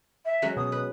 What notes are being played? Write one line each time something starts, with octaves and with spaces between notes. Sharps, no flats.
E5
F#3 G#3 C#4
B2 D#6
B4